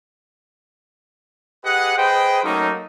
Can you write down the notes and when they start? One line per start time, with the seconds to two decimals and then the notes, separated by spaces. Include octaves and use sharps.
1.65 G4 G#4 B4 D#5 F#5
1.97 G#4 B4 C5 D#5 G5
2.44 F#3 A3 A#3 C#4 D#4